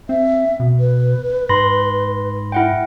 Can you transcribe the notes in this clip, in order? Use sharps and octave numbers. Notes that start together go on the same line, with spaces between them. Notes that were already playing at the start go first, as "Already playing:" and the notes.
C4 E5
B2
B4
G#2 B5 C6 A#6
E4 F#5 G5